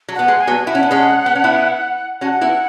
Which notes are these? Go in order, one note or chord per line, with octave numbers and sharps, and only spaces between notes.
F#3
B3 F#5
G#3
G#5
F#3 B3
E4 F#5
C#4
B3
G#3 C#4
B3
C#4
B3 E4
C#4 F#4 F#5
B3 E4